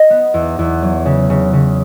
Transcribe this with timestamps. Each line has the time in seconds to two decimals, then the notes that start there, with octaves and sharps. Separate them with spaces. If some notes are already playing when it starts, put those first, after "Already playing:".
Already playing: D#5
0.10 B3
0.34 E2
0.59 E2
0.82 F#3
1.06 C#3
1.30 C#3
1.53 C#3